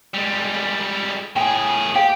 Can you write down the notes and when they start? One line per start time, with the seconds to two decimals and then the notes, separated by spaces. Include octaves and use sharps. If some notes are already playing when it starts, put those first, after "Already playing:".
0.14 G3 G#3
0.56 D5
1.36 A2 G#4 G5 G#5
1.95 G4 C5 F5 G5